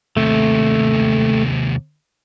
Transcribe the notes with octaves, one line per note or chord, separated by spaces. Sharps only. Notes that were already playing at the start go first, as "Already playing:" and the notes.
D#2 C3 A3